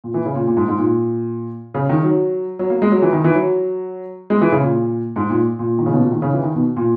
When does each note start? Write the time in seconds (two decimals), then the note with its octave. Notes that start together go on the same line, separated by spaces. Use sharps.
0.04 A#2
0.14 E3
0.26 C#3
0.35 A#2
0.47 A#2
0.57 G#2
0.68 G#2
0.79 A#2
1.74 C#3
1.89 D#3
2.03 F#3
2.59 F#3
2.70 A#3
2.82 G#3
2.92 F#3
3.02 E3
3.13 D#3
3.24 E3
3.35 F#3
4.30 G#3
4.41 E3
4.52 C#3
4.62 A#2
5.16 G#2
5.30 A#2
5.59 A#2
5.79 D#3
5.86 C#3
5.93 B2
6.01 A#2
6.12 D#3
6.22 C#3
6.33 E3
6.43 D#3
6.55 B2
6.76 A#2